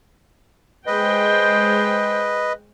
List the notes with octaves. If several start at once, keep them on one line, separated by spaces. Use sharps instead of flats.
G#3 B4 C5 D#5 G5